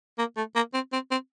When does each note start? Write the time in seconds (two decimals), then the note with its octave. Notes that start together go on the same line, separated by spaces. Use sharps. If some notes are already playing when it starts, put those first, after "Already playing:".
0.19 A#3
0.37 A3
0.56 A#3
0.74 C4
0.93 C4
1.11 C4